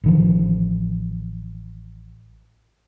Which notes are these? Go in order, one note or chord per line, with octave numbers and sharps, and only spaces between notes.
A1 D#3 F3